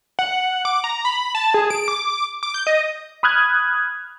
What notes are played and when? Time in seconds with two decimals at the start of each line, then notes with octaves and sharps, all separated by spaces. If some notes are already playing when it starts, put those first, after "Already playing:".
0.19 F#5
0.65 D6
0.84 A#5
1.05 B5
1.35 A5
1.54 G#4
1.70 D7
1.88 D6
2.43 D6
2.54 G6
2.67 D#5
3.23 B5 D#6 F6 F#6 G#6